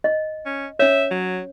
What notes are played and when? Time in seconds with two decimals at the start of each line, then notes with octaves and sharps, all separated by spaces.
0.04 D#5
0.46 C#4
0.79 C#4 C#5 E5
1.11 F#3